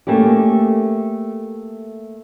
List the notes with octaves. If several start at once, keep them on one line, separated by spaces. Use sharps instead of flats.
A3 A#3 C#4 G4